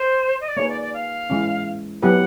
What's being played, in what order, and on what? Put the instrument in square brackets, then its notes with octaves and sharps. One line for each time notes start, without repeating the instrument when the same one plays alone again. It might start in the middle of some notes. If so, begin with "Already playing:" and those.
Already playing: [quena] C5
D#5
D5
[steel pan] A#3 D#4 G#4 B4 [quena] C#5
[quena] D5
D5
F5
[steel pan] E3 G#3 C#4
[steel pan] F#3 B3 E4 G4 B4 [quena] F#5